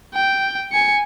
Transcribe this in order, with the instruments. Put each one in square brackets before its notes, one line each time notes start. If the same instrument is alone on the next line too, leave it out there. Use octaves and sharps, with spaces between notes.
[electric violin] G5
G#5 C#7